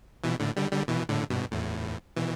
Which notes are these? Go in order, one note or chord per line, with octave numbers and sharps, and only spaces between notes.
B2 E3
A2 D3
D3 G3
D3 G3
B2 E3
A2 D3
G2 B2
E2 A2
B2 E3